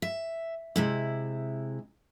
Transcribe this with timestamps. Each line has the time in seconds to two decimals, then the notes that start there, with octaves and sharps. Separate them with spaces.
0.02 E5
0.76 C3 G#3 E4